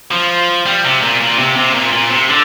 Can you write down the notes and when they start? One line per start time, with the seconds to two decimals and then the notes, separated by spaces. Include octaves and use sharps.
0.11 F3
0.66 G3
0.84 C3
1.02 A#2
1.20 A#2
1.38 C3
1.57 C3
1.74 A#2
1.93 A#2
2.10 C3
2.28 D3